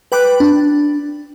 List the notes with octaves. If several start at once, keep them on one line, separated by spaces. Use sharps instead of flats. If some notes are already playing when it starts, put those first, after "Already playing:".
B4 G5 B5 D6 F#6
D4